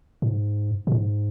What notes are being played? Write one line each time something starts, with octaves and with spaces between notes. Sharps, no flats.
G#2
A#2
G#2